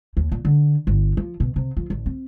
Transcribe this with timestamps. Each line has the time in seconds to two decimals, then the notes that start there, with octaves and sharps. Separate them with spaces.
0.17 D#2
0.32 A#2
0.45 D3
0.87 G1
1.17 F3
1.40 B2
1.56 C3
1.77 F3
1.90 A1
2.06 C4